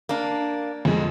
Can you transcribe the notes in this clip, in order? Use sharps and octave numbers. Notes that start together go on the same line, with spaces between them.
A#3 D4
F2 G#3